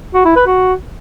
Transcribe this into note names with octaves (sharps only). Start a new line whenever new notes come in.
F#4
E4
B4
F#4